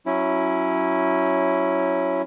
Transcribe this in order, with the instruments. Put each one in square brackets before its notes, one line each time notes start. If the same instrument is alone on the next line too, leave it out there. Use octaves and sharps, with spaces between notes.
[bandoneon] F#3 C#4 E4